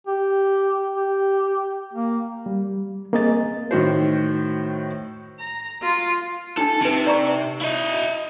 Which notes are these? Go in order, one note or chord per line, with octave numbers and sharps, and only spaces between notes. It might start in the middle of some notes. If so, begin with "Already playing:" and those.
G4
G4
A#3
G3
A#3 C4 G#4 D#5 A6
A2 D#3 F#4 C5
A#5
F4
D4 D#4 A4
C3 D#4 B4
D5 A#5 C#6
E4 D#5